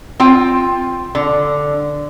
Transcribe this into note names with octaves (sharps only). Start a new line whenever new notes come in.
C4 F4 G5
D3